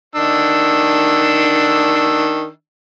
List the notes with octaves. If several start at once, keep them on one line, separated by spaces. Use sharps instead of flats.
D#3 D4 E6